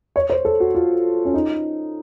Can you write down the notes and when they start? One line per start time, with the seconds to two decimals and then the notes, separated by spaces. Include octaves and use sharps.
0.16 C#5
0.30 C5
0.45 A4
0.60 F#4
0.75 F4
1.25 C#4
1.34 D#4